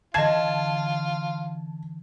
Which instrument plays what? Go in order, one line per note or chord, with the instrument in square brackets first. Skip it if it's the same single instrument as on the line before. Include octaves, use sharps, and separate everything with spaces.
[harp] D3 E3 [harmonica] F4 [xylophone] D#5 C7 [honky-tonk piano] A5 G#6